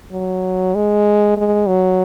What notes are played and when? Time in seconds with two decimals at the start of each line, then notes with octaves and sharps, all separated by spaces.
0.12 F#3
0.75 G#3
1.37 G#3
1.68 F#3